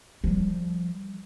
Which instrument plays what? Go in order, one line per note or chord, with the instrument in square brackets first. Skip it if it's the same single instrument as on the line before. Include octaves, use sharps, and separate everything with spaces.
[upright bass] F3 G3